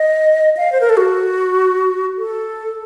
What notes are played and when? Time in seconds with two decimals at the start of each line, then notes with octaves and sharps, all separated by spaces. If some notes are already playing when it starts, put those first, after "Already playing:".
Already playing: D#5
0.57 F5
0.72 C5
0.81 A#4
0.89 A4
0.97 F#4
2.18 A4